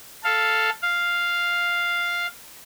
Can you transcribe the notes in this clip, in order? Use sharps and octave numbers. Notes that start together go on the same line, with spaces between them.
A4 F5
F5